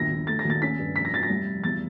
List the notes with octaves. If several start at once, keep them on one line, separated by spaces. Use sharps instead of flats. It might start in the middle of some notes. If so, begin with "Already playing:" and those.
Already playing: G1 D#2 A#6
G1
A3 A6
A#6
D#2
A6
C#4 B6
G2
F1 B6
A#6
F1 A6
A#6
G3
F1
E2 A6